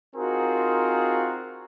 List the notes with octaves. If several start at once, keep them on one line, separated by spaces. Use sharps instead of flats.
C4 D#4 F4 F#4 G#4 A#4